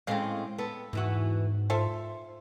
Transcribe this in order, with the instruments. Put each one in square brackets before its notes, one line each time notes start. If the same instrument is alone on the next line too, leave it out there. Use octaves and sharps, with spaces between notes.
[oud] A2 G#3 C4 [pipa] C#3 F5
[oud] B3 [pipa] A4
[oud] E2 E3 F#4 [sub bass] G#2
[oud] F4 [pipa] A4 C5 E5